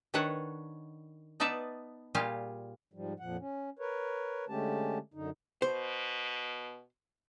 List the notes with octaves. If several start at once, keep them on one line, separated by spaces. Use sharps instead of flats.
D#3 D4 A4 B4 C#5 F#5
B3 D#4 B4 D5 E5 A5
A#2 G3 F4 G4 G#4 F5
G#2 F3 G3
F2 A#2 F3 F#5
C#4
A#4 B4 C#5
D3 G#3 A3 C#4 G4 A5
F#2 D3 D#4
B2 C5